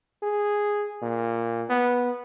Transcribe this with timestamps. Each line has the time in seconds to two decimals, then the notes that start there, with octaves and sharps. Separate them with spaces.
0.23 G#4
1.02 A#2
1.70 B3